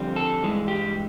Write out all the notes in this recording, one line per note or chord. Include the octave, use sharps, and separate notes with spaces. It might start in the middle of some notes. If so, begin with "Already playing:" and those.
Already playing: F2 D3 G3 C4
A4
G2 E3 G#3
G4